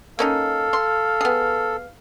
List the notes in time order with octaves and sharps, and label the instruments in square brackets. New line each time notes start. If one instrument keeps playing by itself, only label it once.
[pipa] A#3 C#4 D#4 [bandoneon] A4 [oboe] F5
[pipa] C6
B3 G#4